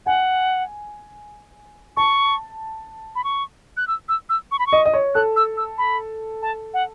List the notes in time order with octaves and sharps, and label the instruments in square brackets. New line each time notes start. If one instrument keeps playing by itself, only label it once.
[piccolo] F#5 [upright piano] G#5
[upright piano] A5 [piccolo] C#6
[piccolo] B5
C#6
F#6
E6
E6
E6
C#6
B5
C#6
[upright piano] D#5
D#5
C#5
[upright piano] A4 [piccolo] F#6
[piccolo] E6
E6
B5
A5
F#5